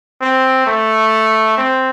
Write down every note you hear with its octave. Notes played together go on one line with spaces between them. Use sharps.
C4
A3
C4